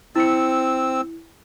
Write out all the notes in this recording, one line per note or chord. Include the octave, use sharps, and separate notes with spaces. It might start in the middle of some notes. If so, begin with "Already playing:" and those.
C4 E4 E6 C#7